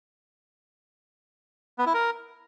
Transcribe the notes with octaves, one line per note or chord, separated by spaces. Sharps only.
B3
E4
A#4